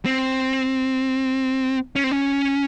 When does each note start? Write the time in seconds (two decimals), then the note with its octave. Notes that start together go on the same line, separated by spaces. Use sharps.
0.06 C4
1.96 C#4
2.04 C4
2.11 C#4